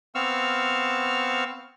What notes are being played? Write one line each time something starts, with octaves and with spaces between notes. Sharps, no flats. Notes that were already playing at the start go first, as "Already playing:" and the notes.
B3 C4 F5 C#6 E6 F6